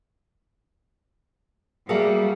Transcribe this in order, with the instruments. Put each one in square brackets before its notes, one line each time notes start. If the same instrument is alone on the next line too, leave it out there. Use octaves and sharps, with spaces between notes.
[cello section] G3 [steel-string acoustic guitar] A#3 F#4 A4 [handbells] G#4 E5 F5